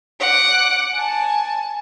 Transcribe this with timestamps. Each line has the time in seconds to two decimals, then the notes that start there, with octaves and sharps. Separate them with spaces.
0.20 F#5 D6
0.93 G#5 A5